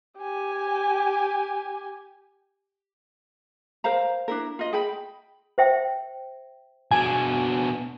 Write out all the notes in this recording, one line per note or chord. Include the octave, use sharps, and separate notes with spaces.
G4 G#5
A#4 C5 F5 A#5
D4 E4 A#4
F4 D#5
G#4 G5 B5
C5 E5 G5
B2 D4 G#5